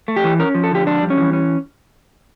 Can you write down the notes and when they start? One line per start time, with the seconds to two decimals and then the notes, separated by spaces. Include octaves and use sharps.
0.08 A3
0.16 G4
0.24 E3
0.39 C#4 A#4
0.55 F3
0.64 A4
0.71 D3 G4
0.86 F2 D4
1.03 G3
1.10 C#4
1.18 E3
1.33 C#4